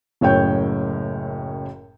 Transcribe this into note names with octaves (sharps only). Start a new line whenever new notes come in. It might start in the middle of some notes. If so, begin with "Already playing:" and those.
F#1 F#2 A2 C#5 G5 G6